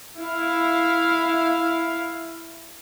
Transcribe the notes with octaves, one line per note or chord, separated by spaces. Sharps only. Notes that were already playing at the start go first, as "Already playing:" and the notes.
E4 F5